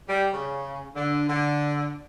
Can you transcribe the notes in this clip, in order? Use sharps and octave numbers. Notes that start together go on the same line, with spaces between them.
G3
C#3
D3
D3